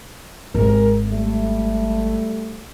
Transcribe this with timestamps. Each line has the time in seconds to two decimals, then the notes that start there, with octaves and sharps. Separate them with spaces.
0.55 G#1 C3 G#3 A#4
1.08 G3 A3